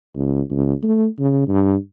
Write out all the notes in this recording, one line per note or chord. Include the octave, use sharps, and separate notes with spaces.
C#2
C#2
A3
C#3
G2